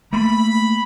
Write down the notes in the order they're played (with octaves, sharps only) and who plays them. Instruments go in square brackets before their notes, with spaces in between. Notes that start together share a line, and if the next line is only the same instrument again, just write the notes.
[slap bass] A3 A#3 [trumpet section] B5